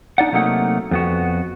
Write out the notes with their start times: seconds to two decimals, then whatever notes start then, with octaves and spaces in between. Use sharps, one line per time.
0.18 D4 D#4 D5 F#5
0.32 C3 F#3 A3 A#3 D#4 F#5
0.91 F2 B3 F#4